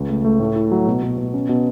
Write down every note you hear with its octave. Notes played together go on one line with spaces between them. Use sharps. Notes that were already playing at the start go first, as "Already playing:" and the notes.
Already playing: C#2
A3
A3
A2
E4
F#3
B2
B2
B2
C#4
B2